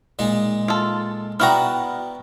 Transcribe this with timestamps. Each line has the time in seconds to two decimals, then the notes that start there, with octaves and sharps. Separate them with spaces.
0.19 A#2 G#3 D#4
0.68 F4 A4
1.40 B3 E4 F#4 D5 F#5 G5 A#5 F6